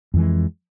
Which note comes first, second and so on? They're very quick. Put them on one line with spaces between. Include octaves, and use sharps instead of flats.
F2 E3 G#3